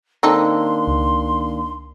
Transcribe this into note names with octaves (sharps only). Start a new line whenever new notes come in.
D#3 A#3 C4 D4 D#4 A4 C6
C#2